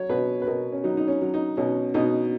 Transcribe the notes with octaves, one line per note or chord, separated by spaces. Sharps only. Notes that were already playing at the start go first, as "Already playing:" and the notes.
Already playing: F#3 C#5
B2 B4
B4
B2 A#4
C#4
F#3 D#4
D#4
C#4
F#3
D#4
B2 C#4
B2 D#4